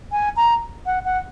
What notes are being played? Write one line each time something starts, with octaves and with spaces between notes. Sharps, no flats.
G#5
A#5
F#5
F#5